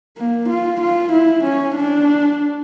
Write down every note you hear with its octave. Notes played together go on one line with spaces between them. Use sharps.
A#3
F4
F4
E4
C#4
D4